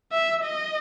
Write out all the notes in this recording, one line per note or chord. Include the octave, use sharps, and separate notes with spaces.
E5
D#5